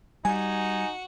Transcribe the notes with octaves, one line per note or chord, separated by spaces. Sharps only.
G3 D#4 F#4 G#5